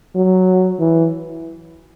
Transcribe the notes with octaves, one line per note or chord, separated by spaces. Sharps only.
F#3
E3